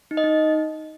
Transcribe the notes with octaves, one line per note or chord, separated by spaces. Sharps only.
D#4
D#5
D#4